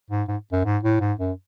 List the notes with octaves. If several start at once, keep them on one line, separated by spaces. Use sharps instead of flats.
G#2
G#2
F#2
G#2
A2
G#2
F#2